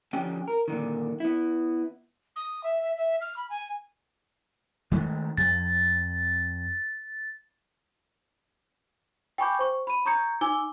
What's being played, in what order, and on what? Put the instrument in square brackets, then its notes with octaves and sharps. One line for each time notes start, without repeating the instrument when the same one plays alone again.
[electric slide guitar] D3 F3 C#4 G4 G5 G#5
A#4
A#2 D3 D#3
B3 E4
[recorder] D#6
E5
E5
E5
F6
B5
G#5
[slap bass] D#3 G#3 A3
[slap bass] F2 [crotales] A6
[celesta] G5 G#5 B5 C#6 D6 G6
C5 C#6
B5 D#7
A#5 C#6 D#6 G6 G#6 C#7
D#4 G#5 D6 E6 G7